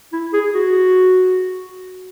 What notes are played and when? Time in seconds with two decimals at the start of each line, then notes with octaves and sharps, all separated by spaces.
0.13 E4
0.34 G#4
0.55 F#4